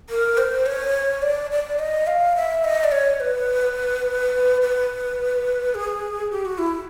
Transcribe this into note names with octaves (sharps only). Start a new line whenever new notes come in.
A#4
C5
C#5
D5
D5
D#5
F5
E5
D#5
D5
C#5
B4
B4
G#4
G4
F#4
E4